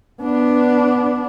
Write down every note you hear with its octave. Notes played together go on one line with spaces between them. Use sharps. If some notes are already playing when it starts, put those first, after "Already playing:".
B3 D4